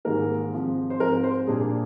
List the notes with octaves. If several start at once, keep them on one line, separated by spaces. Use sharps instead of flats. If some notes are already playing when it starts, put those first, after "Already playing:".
G#2 D#3 G3 A#3 A#4
G#2 F3 C4
C5
G#2 F3 C4 A#4
C5
A#2 G3 A#3 D4 G#4